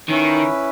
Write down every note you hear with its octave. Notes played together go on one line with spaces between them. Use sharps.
D#3 C#4 E4 B4